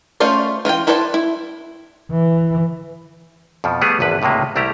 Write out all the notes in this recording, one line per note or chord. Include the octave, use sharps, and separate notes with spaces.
A3 C#4 F4 C5 D5
E3 F4 F#4 G5
E4 A4 B4 C5 D5
E4
E3
F2 B2 F3
G3 A3 B3 G4 G#4
G#1 E2 D3 B4
C#2 A2 C3 G#3 A#3
C2 G3 A3 E4 G4 A#5